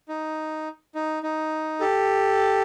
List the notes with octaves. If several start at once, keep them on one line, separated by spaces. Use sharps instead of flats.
D#4
D#4
D#4
G4 A4